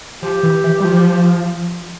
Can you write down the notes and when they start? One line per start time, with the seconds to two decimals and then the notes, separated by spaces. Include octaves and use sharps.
0.22 F3 G4
0.43 E3
0.64 E3
0.80 G3
0.84 F3